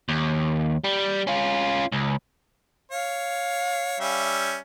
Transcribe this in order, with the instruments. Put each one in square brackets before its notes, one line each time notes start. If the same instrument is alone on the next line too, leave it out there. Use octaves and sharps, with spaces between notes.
[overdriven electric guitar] D#2
G3
C#4 F4
C#2
[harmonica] C#5 [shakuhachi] F5
[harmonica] G3 C#4 E5